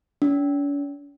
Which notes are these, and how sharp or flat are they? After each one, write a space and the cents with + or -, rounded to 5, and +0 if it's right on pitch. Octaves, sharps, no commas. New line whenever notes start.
C#4 +45